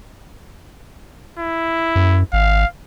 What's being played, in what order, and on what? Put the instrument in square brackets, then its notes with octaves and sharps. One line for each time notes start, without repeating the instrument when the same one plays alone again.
[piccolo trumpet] E4
[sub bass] F#2
[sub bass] G#1 [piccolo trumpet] F5